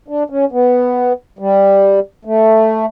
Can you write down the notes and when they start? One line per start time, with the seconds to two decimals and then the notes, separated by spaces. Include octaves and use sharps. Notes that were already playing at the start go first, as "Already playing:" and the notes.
0.08 D4
0.30 C#4
0.52 B3
1.39 G3
2.25 A3